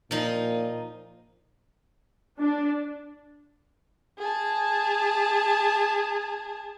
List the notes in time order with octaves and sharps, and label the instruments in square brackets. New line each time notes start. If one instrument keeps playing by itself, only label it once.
[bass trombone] A#2 [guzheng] F3 D#4
[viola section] D4
[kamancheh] G#4 A5